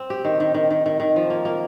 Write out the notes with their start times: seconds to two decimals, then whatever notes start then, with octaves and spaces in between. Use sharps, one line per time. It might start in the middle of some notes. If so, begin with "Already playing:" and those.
Already playing: C4
0.10 G4
0.25 D#3
0.40 D#3
0.54 D#3
0.70 D#3
0.86 D#3
1.00 D#3
1.16 F3
1.30 A#3
1.45 A#3